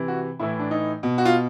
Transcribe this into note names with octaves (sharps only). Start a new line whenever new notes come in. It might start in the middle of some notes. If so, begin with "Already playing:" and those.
Already playing: C3 E3
F#4
A2 E3 E4
D4
D#4
B2
F#4
F4